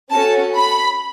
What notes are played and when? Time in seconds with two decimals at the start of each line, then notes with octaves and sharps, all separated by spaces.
0.11 C#4 F#4 A4 A5
0.55 B5